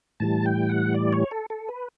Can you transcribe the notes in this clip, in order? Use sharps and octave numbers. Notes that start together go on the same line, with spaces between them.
A2 E3 G3 A5
G5
F#5
D5
C#5
A4
A4
B4